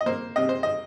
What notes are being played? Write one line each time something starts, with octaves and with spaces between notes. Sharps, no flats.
D#5
A#3 C5
C3 D#5
C5
D#5